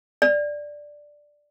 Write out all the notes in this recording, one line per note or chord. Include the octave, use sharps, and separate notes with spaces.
D5